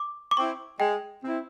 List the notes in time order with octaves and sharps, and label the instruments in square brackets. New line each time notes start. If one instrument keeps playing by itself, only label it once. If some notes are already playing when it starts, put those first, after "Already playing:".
Already playing: [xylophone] D6
D6
[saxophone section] C4 E4 [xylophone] C#6
[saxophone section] G#3 [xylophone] G5
[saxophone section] C4 E4